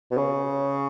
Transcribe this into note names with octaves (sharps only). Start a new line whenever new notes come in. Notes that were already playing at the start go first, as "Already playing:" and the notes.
B2
C#3